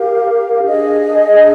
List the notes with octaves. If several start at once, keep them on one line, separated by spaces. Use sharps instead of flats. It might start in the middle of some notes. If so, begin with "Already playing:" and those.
Already playing: G4 A#4 F5
D4 G#4 D#5